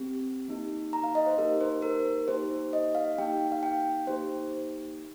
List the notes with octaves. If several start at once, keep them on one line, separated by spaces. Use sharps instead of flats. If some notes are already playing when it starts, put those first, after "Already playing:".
Already playing: C4 G4
A#3 D#4 G4
A#5
F5
D#5
C5
A#3 D#4 G4 A#4
C5
A#4
A#3 D#4 G4 C5
D#5
F5
A#3 D#4 G4 G5
F5
G5
A#3 D#4 G4 C5